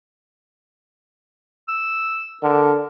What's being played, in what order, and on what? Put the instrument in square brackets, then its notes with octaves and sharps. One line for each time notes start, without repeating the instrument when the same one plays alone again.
[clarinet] E6
[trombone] D3 [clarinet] A#4